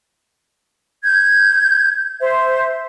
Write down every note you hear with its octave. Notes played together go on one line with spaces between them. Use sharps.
G6 G#6
C5 E5